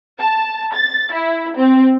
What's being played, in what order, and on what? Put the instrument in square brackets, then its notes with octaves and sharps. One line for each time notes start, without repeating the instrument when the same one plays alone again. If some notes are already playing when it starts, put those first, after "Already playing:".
[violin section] A5
A6
E4
C4